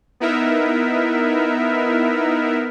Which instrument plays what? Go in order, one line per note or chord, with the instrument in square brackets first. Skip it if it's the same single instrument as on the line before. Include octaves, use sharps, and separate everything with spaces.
[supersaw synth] B3 D#4 E4 A#4 E5